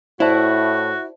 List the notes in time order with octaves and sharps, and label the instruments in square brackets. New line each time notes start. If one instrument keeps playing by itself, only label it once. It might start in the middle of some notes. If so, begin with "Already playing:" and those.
[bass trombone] A2 [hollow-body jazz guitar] E4 [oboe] F#4 [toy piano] C5 D5 A5